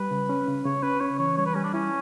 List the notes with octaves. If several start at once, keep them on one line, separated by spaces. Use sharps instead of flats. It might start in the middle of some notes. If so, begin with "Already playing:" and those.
Already playing: G3 B4
C#3
C#4
C#3
C#3 C#5
C#4 B4
C#4 C#5
E3 C#5
G3 C#5
B4
G3 C#4
D4
C#4 E4